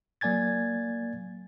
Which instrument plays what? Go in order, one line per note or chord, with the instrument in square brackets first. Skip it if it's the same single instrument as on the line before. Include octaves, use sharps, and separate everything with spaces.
[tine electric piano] F#3 A#3 D5 G#5 G#6 A6